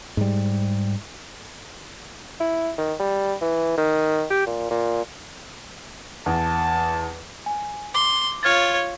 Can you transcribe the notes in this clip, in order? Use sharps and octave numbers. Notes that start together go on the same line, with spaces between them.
G#2 G3
E4
D#3
G3
E3
D#3
G4
A#2
A#2
E2 A5
G#5
C6 D6
F4 C#5 F6 G#6 A6